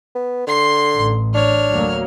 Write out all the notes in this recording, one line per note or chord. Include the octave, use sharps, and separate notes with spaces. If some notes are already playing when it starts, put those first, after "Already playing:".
B3
D3 C6 C7
A1
D4 C#5 F6
D2 F#3 A#3